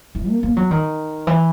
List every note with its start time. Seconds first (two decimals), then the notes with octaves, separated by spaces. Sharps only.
0.15 E3
0.28 A#3
0.43 A#3
0.57 F#3
0.71 D#3
1.27 E3